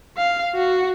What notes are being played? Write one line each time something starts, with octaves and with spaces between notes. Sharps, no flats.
F5
F#4